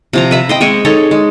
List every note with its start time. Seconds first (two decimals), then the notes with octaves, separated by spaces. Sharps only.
0.13 C3 F3 A#5
0.31 B4 E5 A#5
0.49 C5 D#5 G5
0.61 G#3 C4 G#5 C#6
0.85 D#4 G#4 A4 C#5
1.11 G#3